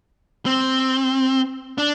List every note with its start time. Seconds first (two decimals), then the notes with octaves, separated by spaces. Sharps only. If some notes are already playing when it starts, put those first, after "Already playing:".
0.46 C4
1.78 D4